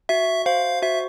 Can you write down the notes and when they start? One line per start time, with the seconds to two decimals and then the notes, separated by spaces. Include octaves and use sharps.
0.09 F#4 E5
0.46 C5 F5
0.82 F#4 E5